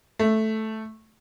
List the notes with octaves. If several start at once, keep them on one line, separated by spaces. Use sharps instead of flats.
A3